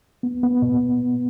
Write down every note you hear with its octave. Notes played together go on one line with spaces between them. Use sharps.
B3
B3
A#2